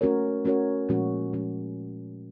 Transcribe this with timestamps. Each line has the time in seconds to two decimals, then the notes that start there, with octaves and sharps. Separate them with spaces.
0.01 A3 C#4 F#4 A#4 C#5
0.45 A3 C#4 F#4 A#4 C#5
0.89 A#2 F3 G#3 C#4 F#4
1.33 A#2 F3 G#3 C#4 F#4